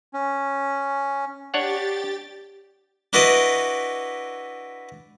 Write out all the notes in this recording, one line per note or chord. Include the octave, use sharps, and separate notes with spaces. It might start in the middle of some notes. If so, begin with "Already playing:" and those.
C#4
D4 G4 C#5 F#5 A6
D4 E4 F#4 B4 D5 D#5